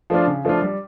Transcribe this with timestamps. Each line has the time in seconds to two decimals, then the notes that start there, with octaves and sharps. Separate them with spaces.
0.10 F3 A3 D4 F4
0.27 C#3
0.45 F3 A3 D4 F4
0.62 G3